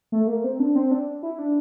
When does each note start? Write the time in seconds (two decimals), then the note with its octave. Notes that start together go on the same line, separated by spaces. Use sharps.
0.12 A3
0.27 A#3
0.44 C4
0.60 D4
0.75 C4
0.91 D4
1.23 E4
1.38 D4